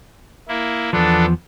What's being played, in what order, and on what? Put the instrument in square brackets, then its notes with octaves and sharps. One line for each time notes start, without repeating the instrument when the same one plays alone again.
[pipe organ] A#3 E4
[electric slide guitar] E2 F3 [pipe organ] B3 D4 A4